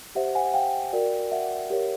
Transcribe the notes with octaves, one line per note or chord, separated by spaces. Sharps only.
G4 C5 E5 F#5
F#5 G#5
F5 G5
F#4 A#4 D5
E5 F#5
G4 A#4 C#5